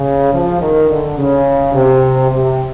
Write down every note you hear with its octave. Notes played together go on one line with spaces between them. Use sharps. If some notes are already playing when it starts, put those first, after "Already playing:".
Already playing: C#3
F3
D#3
D3
C#3
C3
C3